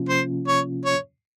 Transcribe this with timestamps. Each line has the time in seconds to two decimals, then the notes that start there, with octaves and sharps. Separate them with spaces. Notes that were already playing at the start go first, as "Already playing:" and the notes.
Already playing: C3 F3 A#3 C#4 F4
0.09 C5
0.48 C#5
0.86 C#5